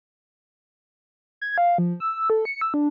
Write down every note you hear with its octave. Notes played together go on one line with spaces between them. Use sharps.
G#6
F5
F3
E6
A4
C#7
E6
D4